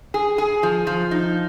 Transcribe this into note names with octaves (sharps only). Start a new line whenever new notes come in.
G#4
G#4
F3
F3
D#4